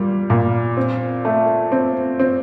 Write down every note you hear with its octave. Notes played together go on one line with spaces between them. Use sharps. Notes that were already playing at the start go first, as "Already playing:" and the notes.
Already playing: A#2 G3
A#2
C4
A3
C4
C4